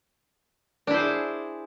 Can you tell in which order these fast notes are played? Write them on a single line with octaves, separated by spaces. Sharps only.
D4 E4 C5 G#4